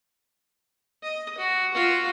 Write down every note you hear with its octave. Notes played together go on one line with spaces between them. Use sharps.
D#5
F#4
F4 F#4